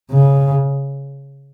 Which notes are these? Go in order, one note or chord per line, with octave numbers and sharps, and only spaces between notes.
C#3